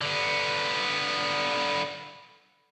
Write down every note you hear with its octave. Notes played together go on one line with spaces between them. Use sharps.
D3 B3